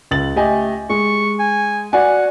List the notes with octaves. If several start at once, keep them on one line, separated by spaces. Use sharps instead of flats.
C#2 A6 F#7
A3 G4 D#5 G#5
G#3 C#6
G#5
F#4 D5 F#5 G#5